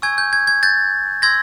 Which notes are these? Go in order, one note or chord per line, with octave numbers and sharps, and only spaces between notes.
G#5 C#6 E6 G6 G#6
G6
G#6
G#6
G6 A6
C6 E6 G6 G#6 A#6